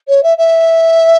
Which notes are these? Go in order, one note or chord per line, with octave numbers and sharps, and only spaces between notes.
C#5
E5
E5